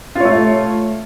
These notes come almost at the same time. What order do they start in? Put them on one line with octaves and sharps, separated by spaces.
F4 C#5 A3